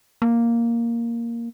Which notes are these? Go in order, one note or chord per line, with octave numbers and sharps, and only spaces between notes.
A#3